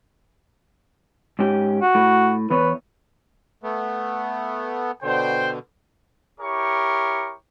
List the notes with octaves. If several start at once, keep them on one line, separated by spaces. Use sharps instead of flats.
G#2 C#4 G4
F#4
A2
E2 B3 B4 C#5
A3 B3
B2 D3 C5 G5
E4 G4 A#4 C#5 C#6